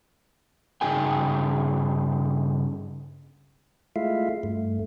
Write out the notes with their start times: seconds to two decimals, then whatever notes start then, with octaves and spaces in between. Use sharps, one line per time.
0.81 G2 C#3 D#4 G#4 G5 G#5
3.96 G#3 A3 E4 F4 E5 F5
4.43 G2 A3